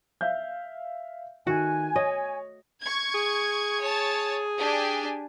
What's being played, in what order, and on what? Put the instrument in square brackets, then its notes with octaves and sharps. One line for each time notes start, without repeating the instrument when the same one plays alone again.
[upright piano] E5 F5 G6
[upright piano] D#3 [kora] A3 F#4 [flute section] G#5
[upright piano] C#5 [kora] D#5
[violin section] C#6 G#6
[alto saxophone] G#4
[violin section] C#5 A5
D4 G4 G#5